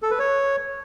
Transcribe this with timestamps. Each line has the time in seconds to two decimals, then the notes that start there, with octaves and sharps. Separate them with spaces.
0.02 A4
0.11 B4
0.19 C#5